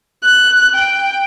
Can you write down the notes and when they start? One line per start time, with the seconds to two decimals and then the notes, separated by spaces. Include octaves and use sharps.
0.23 F#6
0.75 G5